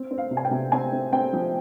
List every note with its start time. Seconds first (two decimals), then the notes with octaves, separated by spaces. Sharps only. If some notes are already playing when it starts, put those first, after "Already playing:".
Already playing: C4
0.11 C4
0.18 F5
0.31 C3
0.37 G#5
0.45 G5
0.51 C3
0.72 C4 G#5
0.92 C4
1.12 C4 G5
1.33 F3